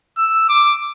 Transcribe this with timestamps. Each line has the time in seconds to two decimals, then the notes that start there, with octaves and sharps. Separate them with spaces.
0.18 E6
0.49 D6